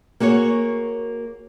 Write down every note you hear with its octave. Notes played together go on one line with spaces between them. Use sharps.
A#3 F#4 G#4 C#5